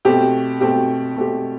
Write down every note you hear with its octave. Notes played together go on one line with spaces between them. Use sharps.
B2 A3 C4 G4
B2 A3 C4 G4
B2 A3 C4 G4